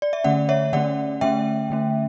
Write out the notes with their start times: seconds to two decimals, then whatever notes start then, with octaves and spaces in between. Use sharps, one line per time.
0.02 D5
0.13 E5
0.24 D3 A3 C#4 D5 F#5
0.49 C#5 E5
0.73 D3 A3 C#4 D5 F#5
1.21 D3 A3 C#4 E5 G5
1.70 D3 A3 C#4